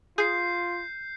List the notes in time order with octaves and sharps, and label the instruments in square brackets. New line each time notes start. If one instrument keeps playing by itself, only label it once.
[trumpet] F4 [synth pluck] G#4 [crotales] G6 C7